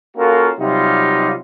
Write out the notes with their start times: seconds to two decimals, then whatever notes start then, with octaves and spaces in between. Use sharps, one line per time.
0.17 A#3 C#4 F4 F#4 A4 A#4
0.59 C3 F#3 G3 D#4 F4